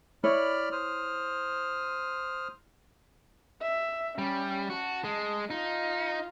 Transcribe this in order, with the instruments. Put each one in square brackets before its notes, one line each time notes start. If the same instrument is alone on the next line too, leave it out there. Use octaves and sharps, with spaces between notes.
[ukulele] E4 C#5 [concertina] D5 B5 F6
[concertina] C5 D#6 F6
[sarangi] E5
[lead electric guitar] G3 [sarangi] C#4
[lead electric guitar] F#4 [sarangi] A5
[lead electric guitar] G#3
[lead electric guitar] D#4 [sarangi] F4